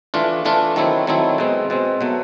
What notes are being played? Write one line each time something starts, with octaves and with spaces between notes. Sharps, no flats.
E3 A3 D4 F4
E3 A3 D4 F4
D#3 F#3 A3 C4 E4
D#3 F#3 A3 C4 E4
B2 G#3 C4
B2 G#3 C4
B2 F#3 A3